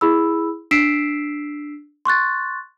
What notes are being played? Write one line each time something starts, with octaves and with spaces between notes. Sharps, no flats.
E4 G#4 B5 E6
D4 E6 B6 C7 D7 E7
C6 C#6 F#6 A6